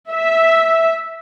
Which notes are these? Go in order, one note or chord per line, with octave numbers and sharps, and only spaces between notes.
E5